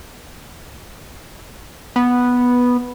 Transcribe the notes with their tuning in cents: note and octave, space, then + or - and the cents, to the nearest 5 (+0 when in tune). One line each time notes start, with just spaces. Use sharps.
B3 -5